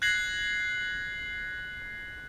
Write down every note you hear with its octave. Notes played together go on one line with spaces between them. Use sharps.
F#6 G#6 A#6 C7 F#7